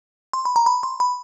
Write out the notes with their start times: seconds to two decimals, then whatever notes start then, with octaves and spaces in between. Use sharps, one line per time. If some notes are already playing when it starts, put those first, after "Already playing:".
0.33 C6
0.45 B5
0.56 A#5
0.66 B5
0.83 C6
1.00 B5